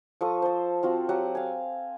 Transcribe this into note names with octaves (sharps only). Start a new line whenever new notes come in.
F3 A4 C#6 D#6
C5 A5
C4 F4 F#4
F#3 G4 F#5
F5 G#5